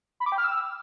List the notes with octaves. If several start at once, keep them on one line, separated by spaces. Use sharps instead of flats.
B5
D6
G5
F6
E6